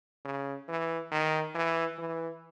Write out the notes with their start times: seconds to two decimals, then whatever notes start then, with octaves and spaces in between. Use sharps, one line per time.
0.25 C#3
0.69 E3
1.11 D#3
1.55 E3
1.98 E3